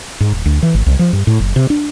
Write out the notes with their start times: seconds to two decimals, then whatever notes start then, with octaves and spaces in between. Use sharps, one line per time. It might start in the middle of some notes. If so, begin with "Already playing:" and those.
0.20 G#2
0.32 D#1
0.46 D2
0.63 E3
0.74 G#1
0.86 C2
0.99 F3
1.13 G2
1.27 A2
1.40 F#1
1.56 C3
1.70 D4